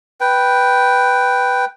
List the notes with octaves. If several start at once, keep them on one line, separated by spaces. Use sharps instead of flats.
B4 G5